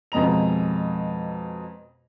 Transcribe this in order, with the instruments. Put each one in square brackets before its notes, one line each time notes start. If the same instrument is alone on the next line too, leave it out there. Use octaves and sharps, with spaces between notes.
[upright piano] F2 B2 G#3 D#5 A#5 F7